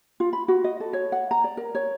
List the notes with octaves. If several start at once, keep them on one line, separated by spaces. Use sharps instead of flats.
F4
B5
F#4
D#5
A4
C#5
F#5
A#5
D5
A#4
C#5